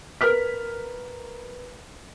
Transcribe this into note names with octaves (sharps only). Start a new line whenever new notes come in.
A#4 B4 F6 B6